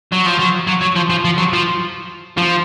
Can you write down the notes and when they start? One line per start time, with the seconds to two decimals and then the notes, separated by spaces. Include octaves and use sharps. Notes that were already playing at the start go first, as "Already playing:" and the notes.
0.12 F#3
0.26 F3
0.39 F#3
0.68 F#3
0.82 F#3
0.96 F3
1.10 F3
1.25 F3
1.38 F#3
1.53 F3
2.38 F3